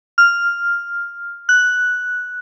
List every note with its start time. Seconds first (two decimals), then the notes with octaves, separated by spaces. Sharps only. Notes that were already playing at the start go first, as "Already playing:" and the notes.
0.18 F6
1.49 F#6